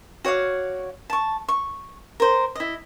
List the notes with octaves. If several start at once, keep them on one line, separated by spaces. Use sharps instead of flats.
F#4 C#5 D5 F5
A5 C#6
C#6
A#4 C5
E4 D#5